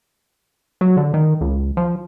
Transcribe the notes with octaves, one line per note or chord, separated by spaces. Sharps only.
F#3
D3
D#3
C#2
F3